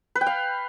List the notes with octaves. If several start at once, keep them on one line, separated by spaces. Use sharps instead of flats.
B4
G5
F5